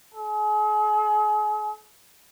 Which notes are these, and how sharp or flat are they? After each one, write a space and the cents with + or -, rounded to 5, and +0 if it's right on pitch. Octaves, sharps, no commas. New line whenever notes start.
G#4 +35